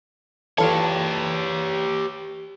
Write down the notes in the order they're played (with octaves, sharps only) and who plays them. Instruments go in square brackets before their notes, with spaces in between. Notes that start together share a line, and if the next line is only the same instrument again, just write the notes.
[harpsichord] E2 E4 [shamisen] F4 A4 [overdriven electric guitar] G4 C#5